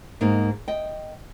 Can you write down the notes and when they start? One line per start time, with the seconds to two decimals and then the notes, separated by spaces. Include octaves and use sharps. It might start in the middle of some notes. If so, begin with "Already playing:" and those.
0.21 G#2 A#3 D#4 C5
0.68 D#5 G5